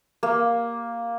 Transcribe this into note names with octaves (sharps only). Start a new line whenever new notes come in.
A#3